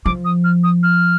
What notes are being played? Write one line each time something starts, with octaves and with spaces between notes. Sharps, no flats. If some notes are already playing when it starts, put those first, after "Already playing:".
F3 D6
D#6
F6
D#6
F6